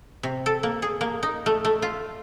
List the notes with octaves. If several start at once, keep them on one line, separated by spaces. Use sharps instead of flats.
C3
A4
A#3
G#4
A#3
D#4
A3
A3
F4